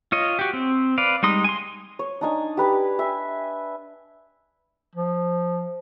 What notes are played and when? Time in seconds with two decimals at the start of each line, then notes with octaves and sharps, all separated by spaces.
0.12 F4 C#5 D#5
0.39 F#4 G4
0.53 C4
0.98 B4 D5 F5
1.23 G3 G#3 D#4 C6 D#6
1.44 G#5 C6
1.99 C#5
2.21 D4 D#4 G#5
2.57 G4 B4 G#5 D6
2.99 E5 G#5
4.95 F3